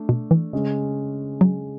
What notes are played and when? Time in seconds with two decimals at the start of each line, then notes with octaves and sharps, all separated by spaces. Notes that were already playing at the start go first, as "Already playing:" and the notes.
Already playing: A3 D4
0.09 B2
0.31 E3
0.53 C#3 G#3 C#4
1.41 F#3